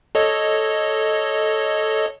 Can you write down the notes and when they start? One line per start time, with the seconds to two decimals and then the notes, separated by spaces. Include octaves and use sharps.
0.15 A4 C#5 D#5